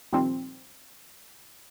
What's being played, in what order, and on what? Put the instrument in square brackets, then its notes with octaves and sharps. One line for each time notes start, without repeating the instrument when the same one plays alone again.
[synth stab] A#2 D#3 F3 G3 C4